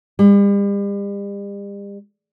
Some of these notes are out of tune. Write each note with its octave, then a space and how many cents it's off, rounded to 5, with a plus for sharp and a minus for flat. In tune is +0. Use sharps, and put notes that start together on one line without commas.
G3 +40